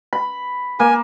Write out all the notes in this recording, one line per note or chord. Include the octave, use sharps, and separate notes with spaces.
B5
A#3 G#5